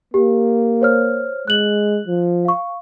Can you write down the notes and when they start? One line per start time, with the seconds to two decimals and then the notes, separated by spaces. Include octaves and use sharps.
0.14 A#3 G4
0.81 C5 C#5 F6
1.48 G#3 F#6 F#7
2.07 F3
2.45 F5 C#6